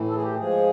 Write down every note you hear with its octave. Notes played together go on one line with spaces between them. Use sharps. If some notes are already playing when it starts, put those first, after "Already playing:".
Already playing: A2 E3
A4
G#4
G4
G#2 F3 G#4